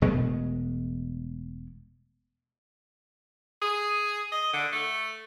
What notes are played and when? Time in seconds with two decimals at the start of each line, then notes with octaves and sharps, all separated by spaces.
0.02 E1 B2 G#3 A3
3.62 G#4
4.32 D#5
4.53 D3
4.73 A3